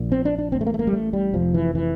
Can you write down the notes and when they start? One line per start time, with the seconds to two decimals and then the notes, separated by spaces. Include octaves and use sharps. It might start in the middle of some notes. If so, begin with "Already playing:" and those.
Already playing: A#1 A#2
0.12 C4
0.25 D4
0.38 D4
0.52 A1 A2 C4
0.61 A3
0.67 A#3
0.74 A3
0.79 A#3
0.87 G3
0.93 A3
1.13 G3
1.33 F1 F2 C3 F3
1.54 E3
1.75 E3